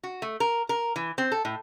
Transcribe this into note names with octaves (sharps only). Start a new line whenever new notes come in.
F#4
A3
A#4
A#4
E3
C4
A4
A2